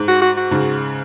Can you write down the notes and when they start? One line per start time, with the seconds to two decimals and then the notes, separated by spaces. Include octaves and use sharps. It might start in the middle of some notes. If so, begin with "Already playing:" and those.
Already playing: G#2
0.08 F#4
0.22 F#4
0.37 F#4
0.51 G#2 C#3